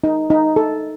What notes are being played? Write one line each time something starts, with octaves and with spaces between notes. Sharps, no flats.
D#4
D#4
A4